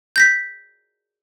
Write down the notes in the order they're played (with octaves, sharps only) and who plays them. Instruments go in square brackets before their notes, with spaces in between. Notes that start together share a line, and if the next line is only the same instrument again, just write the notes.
[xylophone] G6 A#6 B6